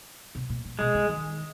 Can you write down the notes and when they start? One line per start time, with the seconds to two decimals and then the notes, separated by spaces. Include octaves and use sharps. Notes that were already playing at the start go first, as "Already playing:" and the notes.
0.35 C3
0.50 A#2
0.65 A#2
0.79 B2 G#3
0.94 C#3
1.09 D#3